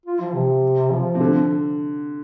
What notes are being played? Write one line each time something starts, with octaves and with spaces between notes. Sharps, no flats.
F4
F3
C3
F3
C3
D3